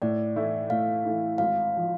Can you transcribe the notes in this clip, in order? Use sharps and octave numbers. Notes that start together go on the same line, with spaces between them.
A2 D5
E3 A3 E4
A2 F5
E3 A3 E4
G#1 F5
F3